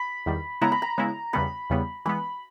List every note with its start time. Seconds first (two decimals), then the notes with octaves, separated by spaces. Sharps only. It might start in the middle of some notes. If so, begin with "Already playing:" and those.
Already playing: B5
0.26 E2 D#3 G3
0.61 C#3 G#3 B3 E4 A#5
0.72 B5
0.82 A#5
0.98 C#3 G#3 B3 E4
1.33 E2 C#3 G3 B3 B5
1.70 E2 C#3 G3 B3
2.05 E3 G#3 B3 B5